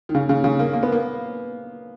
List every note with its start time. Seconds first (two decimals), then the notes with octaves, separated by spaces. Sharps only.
0.09 D#3
0.15 C#3
0.29 C#3
0.44 C#3
0.59 A#3
0.73 A#3
0.83 B3
0.92 A#3